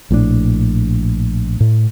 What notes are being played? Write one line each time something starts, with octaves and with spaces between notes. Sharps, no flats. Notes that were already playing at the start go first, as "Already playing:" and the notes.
A#1 A2 C3 D4
A2